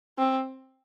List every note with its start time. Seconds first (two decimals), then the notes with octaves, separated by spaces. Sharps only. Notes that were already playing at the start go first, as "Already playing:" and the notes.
0.18 C4